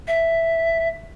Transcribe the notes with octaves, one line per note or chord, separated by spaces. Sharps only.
E5